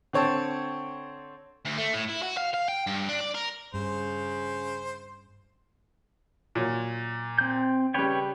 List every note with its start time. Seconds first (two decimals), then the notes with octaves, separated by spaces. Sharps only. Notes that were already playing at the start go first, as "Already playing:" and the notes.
0.13 D3 C4 C#5 G5 A5
1.66 D2
1.78 A3
1.94 A2
2.09 E4
2.23 F#4
2.37 F5
2.54 F5
2.69 G5
2.87 G2
3.09 D4
3.21 D5
3.35 A#4
3.74 G2 C#3 C5
6.55 A#2 F#3
7.38 C4 G6
7.94 C#3 G3 B4 C#5 G5